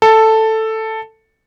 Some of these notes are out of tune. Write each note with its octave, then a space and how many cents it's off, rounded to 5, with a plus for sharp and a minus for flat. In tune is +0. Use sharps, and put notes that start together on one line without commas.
A4 +5